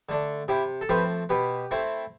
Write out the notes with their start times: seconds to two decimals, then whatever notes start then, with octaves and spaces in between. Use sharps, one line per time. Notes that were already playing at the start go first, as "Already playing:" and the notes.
0.09 D3 A3 D4
0.48 C3 E4 G4
0.81 A4
0.89 F3 A3 C4 G4 B4
1.29 B2 G4 B4
1.71 A3 C4 E4